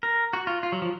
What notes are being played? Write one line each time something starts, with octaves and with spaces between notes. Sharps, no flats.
A#4
F#4
F4
F4
F#3
F3